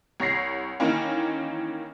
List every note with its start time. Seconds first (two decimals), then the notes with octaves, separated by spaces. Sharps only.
0.20 C2 C#5 A#6 C7
0.80 D#3 E3 A#3 C#4